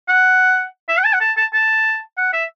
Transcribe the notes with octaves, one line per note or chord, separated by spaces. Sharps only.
F#5
E5
F#5
A5
F#5
A5
A5
A5
F#5
E5